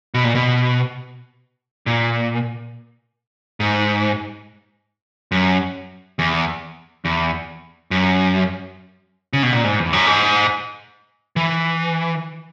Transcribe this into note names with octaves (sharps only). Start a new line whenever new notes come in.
B2
A#2
B2
A#2
G#2
F#2
E2
E2
F#2
C#3
B2
A#2
G#2
E2
F#2
G#2
E3